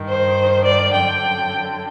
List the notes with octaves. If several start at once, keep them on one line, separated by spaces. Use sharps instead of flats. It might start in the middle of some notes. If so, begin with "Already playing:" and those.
Already playing: G2 D#3
C5
D5
F#2 D3 G5